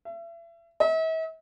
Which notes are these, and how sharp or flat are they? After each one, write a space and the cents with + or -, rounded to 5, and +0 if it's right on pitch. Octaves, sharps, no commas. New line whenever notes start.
E5 +35
E5 -45